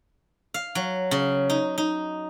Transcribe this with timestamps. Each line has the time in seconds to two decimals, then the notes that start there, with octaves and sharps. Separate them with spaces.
0.54 F5
0.75 F#3
1.11 C#3
1.50 D#4
1.78 D#4